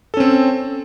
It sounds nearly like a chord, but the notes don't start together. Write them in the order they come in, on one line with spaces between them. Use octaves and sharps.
A4 C#4 C4